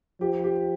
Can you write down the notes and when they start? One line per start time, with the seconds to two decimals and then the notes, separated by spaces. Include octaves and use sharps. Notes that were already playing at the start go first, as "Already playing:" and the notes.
0.21 F3 G4
0.44 G4